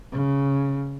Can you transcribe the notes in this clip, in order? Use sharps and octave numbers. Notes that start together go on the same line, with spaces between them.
C#3